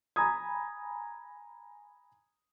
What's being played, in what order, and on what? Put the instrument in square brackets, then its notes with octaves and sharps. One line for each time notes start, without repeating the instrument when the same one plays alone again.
[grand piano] G#5 A#5 B5 D#6 G#6